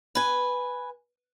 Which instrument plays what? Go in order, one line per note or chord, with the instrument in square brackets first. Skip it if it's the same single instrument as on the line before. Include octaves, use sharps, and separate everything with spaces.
[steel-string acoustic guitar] B4 G#5